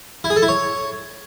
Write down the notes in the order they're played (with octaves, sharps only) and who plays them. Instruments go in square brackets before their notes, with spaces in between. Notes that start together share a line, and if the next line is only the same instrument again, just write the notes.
[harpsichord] E4
G#4
A4
E4
C#5